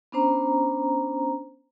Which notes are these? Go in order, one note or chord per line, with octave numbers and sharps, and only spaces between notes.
B3 C#4 D4 C5 A#5